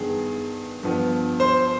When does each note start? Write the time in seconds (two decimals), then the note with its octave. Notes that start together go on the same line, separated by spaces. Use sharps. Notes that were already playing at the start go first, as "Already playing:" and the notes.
Already playing: G2 D#3 B3 G#4
0.83 G2 F3 B3
1.40 C5